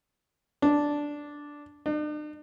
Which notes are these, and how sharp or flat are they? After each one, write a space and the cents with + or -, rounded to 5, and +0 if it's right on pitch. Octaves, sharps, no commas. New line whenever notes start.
D4 -5
D4 +45